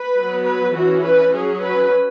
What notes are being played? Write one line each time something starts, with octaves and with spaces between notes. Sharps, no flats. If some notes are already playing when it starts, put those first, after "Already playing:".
Already playing: B4
F#3 B3
B4
E3 C#4 F#4
B4
F#3 C#4 G#4
B4